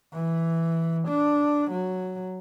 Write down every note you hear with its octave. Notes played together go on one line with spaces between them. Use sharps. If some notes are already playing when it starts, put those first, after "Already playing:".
E3
D4
F#3